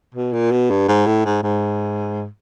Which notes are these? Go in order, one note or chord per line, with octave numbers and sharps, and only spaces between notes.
B2
A#2
B2
G2
G#2
A2
G#2
G#2